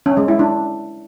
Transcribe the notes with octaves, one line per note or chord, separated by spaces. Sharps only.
C#4
G#3
E4
D4